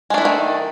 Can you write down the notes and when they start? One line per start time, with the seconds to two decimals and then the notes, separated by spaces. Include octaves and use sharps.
0.10 G#3
0.14 D4
0.18 E4
0.21 A3
0.25 D#3